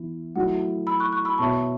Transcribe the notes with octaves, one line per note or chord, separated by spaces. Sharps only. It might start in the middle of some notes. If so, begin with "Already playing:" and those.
Already playing: E3 B3 E4
F#3 A3 E4 F#5
B5 E6
C#6 F#6
C#6 F#6
B5 E6
B2 B3 F#4 C#5 E5 A5 C#6